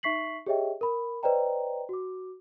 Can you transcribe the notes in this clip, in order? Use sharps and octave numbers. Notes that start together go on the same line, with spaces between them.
D#4 E5 C#6 B6 C7 F#7
G4 G#4 C#5 D#5 E5 G5
A#4 B5
B4 C5 D5 D#5 G5 A#5
F#4 D6